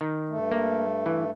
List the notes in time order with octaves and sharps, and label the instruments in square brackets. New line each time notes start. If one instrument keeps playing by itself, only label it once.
[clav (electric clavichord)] D#3
[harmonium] G2 A3
[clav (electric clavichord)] A#3
E3